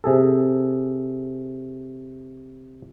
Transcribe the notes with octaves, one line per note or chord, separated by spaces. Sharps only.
C3 G#4 A4